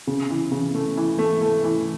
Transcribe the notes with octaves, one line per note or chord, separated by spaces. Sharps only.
C#3
E3
C#3
A3
E3
A3
A3
E3